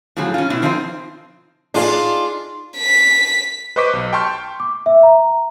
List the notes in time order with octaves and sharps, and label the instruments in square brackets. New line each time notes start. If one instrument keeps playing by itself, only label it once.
[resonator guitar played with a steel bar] A2 C#3 F3 F#3 G#4
C#4 F4
B2 C4 E4
F3 C4 D4 D#4 F4 C5
[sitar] D4 F4 [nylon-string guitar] D#4 G#4 F5
[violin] B6
[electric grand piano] B4 C5 D#5 C#6 D6 B6
B1
G5 A5 C6 C#6 F6 G6
[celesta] D6
E5
A#5